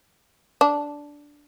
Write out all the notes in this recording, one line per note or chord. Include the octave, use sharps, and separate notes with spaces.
D4